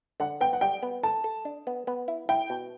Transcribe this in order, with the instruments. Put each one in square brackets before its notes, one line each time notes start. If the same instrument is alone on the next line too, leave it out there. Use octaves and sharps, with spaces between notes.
[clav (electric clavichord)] D3 [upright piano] F#5
[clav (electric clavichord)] B3 [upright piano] G5
[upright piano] F#5
[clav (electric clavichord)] G3 [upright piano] G5
[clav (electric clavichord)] B3
[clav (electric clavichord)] A4 [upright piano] A5
[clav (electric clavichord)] A4
D4
B3
B3
E4
[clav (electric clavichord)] E4 [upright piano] G5
[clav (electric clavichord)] B2